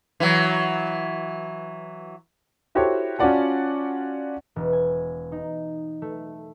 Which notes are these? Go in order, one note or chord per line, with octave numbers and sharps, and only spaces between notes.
E3 F#3
E4 F#4 G4 A4 C5 C#5
C#4 F4 F#4 D5 F#5 A5
E1
G#5
D#4
A3